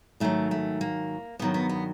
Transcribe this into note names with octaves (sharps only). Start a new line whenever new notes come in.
G#2 D#3 F#3 A3
A3
A#3
G2 D#3 F#3 B3
B3
B3